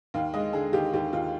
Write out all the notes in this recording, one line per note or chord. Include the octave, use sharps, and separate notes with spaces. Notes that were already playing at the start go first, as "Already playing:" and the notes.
D#2 F5
G#3 D#5
D3 G#4
D#2 G4
D#2 G4
D#2 F4